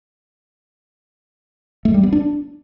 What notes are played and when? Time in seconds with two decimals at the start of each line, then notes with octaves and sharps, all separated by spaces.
1.85 A3
1.94 G3
2.03 B3
2.13 D4